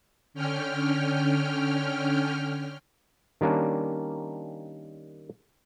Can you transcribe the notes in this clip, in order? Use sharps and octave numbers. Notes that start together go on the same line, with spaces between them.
D3 C#4 G5 F6
D#3 G3 A#3 C#4 D4